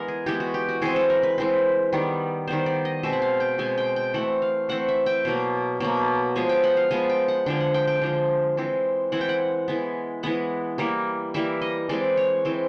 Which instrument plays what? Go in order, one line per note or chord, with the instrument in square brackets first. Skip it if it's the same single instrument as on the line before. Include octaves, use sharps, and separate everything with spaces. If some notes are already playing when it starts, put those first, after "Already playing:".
Already playing: [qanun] E3 G#3 B3 A#4
G#4
E3 G#3 B3 G4
F#4
G4
F#4
E3 G#3 C4 G#4
A4
A#4
B4
E3 G#3 C4
D#3 G3 B3
D#3 G3 B3 C5
D5
D#5
B2 G#3 C4 E5
F#5
F5
G5
B2 G#3 C4 G#5
G5
G5
E3 A3 C4 F#5
F5
E3 A3 C4 F#5
E5
G5
B2 F#3 A#3
B2 F#3 A#3
F3 G#3 B3 G#5
G5
F#5
F5
F3 G#3 B3 G#5
G5
F#5
D3 F3 G#3 G5
F#5
G5
G5
D3 F3 G#3
E3 G#3 C4
E3 G#3 C4 F#5
G5
F#5
E3 G#3 B3
E3 G#3 B3 F#5
E3 G3 A#3
E3 G3 A#3 E5
D#5
E3 G#3 C4 D5
C#5
E3 G#3 C4